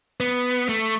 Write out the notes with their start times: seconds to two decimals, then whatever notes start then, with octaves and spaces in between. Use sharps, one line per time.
0.20 B3
0.69 A3